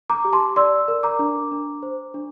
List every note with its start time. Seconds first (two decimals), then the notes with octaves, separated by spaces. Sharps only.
0.10 A#5 D6
0.25 G4
0.33 A5 C6
0.56 D5 C6 E6
0.88 A#4
1.03 A#5 D6
1.19 D4
1.52 D4
1.83 C5
2.14 D4